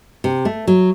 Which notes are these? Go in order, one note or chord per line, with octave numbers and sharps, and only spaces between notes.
C3
A3
F#3